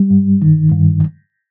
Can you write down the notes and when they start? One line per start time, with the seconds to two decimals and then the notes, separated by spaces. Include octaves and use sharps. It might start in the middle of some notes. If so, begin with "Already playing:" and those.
Already playing: G3
0.10 G2
0.42 D#3
0.72 G2